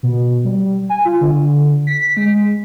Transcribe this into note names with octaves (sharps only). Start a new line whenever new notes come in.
B2
G3
G#5
F4
D3
B6
G#3